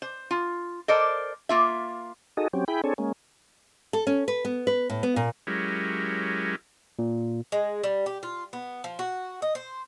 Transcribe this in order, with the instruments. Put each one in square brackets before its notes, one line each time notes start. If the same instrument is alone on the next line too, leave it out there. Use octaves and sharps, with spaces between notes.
[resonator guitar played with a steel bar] C5
F4
A4 A#4 C5 D5 D#5
A#3 F4 E5
[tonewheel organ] D#4 F#4 G#4 A4 D#5
F#3 C4 C#4 G4
E4 G#4 G5 B5
C4 D4 G#4 A4 C#5
G#3 A#3 C#4
[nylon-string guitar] A4
C#4
B4
B3
B4
A2
B3
A#2
[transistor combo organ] F#3 G#3 C#4 E4 G4 A#4
[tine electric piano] A#2
[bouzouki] G#3
G3
G4
F4
B3
F3
F#4
D#5
C5